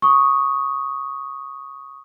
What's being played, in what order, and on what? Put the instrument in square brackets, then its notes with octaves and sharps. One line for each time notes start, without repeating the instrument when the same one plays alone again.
[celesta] C#6 D#6